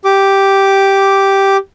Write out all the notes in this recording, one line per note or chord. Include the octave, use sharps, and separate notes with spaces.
G4 D6